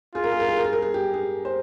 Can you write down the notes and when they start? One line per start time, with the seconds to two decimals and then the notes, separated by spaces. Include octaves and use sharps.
0.15 F4 G#4
0.24 A#4
0.32 G#4
0.40 A#4
0.48 G#4
0.57 A#4
0.64 G#4
0.73 A#4
0.82 G#4
0.94 G4
1.14 G#4
1.45 C5